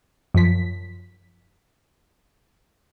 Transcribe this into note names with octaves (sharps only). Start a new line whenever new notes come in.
F#2 F3 B6